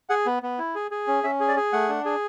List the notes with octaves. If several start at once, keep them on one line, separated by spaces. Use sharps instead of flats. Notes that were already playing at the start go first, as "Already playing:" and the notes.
G#4 F#5
B3
B3
E4
G#4
G#4
C#4
C#4 E5
G#4
D5
G#4
A3 F#5
D4
G#4